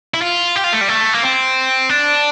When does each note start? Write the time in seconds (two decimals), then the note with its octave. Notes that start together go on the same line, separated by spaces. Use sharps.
0.14 E4
0.22 F4
0.56 G4
0.64 F4
0.72 A3
0.81 G3
0.89 A3
1.13 A#3
1.22 C4
1.89 D4